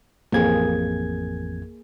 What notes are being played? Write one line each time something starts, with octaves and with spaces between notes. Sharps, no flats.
A1 F2 A#3 G#4 G#6